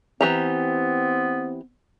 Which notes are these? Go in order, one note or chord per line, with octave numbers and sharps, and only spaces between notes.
E3 B3 C4 G4 A#5